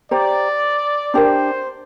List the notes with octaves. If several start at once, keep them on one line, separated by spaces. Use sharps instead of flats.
G4 C5 D5 A#5
D4 G4 A#4 C5